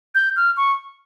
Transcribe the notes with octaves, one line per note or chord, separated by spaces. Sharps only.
G6
F6
C#6